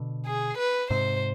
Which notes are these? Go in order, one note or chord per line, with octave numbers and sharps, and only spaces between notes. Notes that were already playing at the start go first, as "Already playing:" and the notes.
Already playing: B2 D3
G#4
B4
G#2 C3 C5